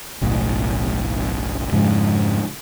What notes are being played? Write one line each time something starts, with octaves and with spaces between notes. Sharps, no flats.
F#1 B1 A2
F2 G#2 C#3